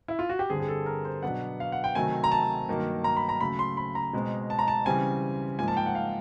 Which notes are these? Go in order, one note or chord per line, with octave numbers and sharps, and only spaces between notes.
E4
F4
F#4
G4
G2 D3 G3 C4 G#4
G#4
A4
A#4
C5
B2 F#3 B3 D4 F#5
F5
F#5
G5
C3 D#3 F#3 A3 C4 G#5
A#5
A5
G2 D#3 F#3 A#3
A#5
B5
A#5
C#3 F#3 A3 B5
C6
B5
A#5
B2 G#3 C4
A5
A#5
A5
C#3 E3 G3 C4 G#5
G#2 F3 A#3 G#5
A5
G5
F#5
F5